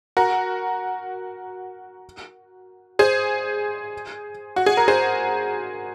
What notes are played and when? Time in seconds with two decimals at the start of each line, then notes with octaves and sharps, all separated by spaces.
0.17 F#4 A#4
2.99 G#4 C5
4.56 F#4
4.66 G#4
4.77 A#4
4.88 G#4 C5